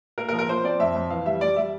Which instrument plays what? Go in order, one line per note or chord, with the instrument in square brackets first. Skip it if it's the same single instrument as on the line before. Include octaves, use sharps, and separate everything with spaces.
[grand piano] A#3 [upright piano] A#4
[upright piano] A#4
[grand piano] F3
[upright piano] A#4
[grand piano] F3 [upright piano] C5
[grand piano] C4 [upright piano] D5
[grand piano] F2 [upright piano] E5
[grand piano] F2
[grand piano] E3 [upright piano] F5
[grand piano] G3 [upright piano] E5
[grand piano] G3 [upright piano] D5
[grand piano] G3 [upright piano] E5